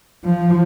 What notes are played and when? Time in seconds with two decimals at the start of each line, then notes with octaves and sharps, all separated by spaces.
0.25 F3